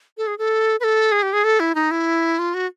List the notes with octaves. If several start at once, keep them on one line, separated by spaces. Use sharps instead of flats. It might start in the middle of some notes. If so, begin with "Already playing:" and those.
A4
G#4
A4
B4
A4
G#4
G4
G#4
A4
E4
D#4
E4
F4
F#4